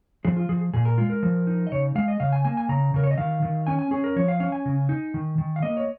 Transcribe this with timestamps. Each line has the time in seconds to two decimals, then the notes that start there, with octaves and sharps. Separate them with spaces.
0.25 F3 G#4
0.37 F4
0.49 F3 G#4
0.74 A#2 G#4
0.85 A#4
0.98 G#3 F4
1.10 A#4
1.23 F3
1.47 D#4
1.67 D#5
1.72 C#3 C#5
1.95 G#3 F5
2.08 D#5
2.20 C#3 F5
2.32 G#5
2.45 A#3 G#5
2.57 G#5
2.69 C#3 A#5
2.94 C#3 A#4
3.04 C#5
3.11 D#5
3.18 D#3 F5
3.42 D#3
3.67 C#4 G#5
3.79 G#5
3.91 C#4 G#4
4.04 A#4
4.16 F3 C#5
4.28 F5
4.40 C#4 F5
4.52 G#5
4.65 C#3
4.89 D#4
5.14 D#3
5.38 D#3
5.56 F5
5.62 A#3 D#5
5.77 C#5